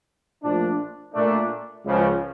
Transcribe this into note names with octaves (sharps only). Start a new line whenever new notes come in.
A#1 A#2 F3 A3 D4
A#2 A3 D4
C#2 C#3 F3